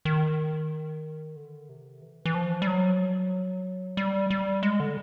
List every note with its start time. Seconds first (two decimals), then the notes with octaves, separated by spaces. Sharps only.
0.05 D#3
1.36 D3
1.69 C3
2.01 E3
2.26 E3
2.35 F3
2.62 G3
2.67 F#3
3.97 G3
4.30 G3
4.63 G#3
4.80 D3